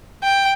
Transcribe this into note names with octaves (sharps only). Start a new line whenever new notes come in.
G5